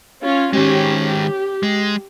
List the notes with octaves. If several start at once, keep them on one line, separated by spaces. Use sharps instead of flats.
C#4 F4
D#3 G#3 C#4 G4
G4
G#3